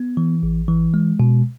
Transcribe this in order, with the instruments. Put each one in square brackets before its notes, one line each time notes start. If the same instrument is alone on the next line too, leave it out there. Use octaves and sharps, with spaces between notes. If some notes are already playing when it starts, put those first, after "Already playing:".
Already playing: [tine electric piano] B3
E3
A1
E3
G#3
B2